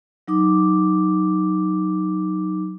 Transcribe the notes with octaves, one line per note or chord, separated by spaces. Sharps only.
F#3 D#4 D6